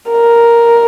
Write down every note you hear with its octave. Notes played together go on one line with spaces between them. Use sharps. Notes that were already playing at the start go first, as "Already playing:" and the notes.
A#4